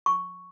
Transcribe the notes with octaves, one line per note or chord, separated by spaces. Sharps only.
C#6